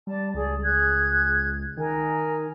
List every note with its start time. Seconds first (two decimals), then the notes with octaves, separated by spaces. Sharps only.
0.07 G3 D5 A5
0.34 C#2 G#4 D5
0.64 G#4 F#6 G#6
1.77 D#3 D#4 A#4 G#5